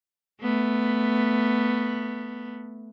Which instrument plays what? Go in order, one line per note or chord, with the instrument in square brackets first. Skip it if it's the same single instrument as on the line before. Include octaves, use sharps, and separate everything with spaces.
[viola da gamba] A3 B3